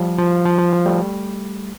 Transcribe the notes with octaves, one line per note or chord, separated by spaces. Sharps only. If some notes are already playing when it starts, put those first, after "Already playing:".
Already playing: F3 G3
F3
F3
F3
F3
G3 A3